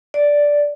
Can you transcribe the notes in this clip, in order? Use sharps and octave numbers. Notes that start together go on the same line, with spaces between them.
D5